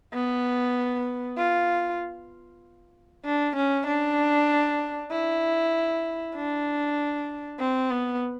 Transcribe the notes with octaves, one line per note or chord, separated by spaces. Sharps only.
B3
F4
D4
C#4
D4
E4
D4
C4
B3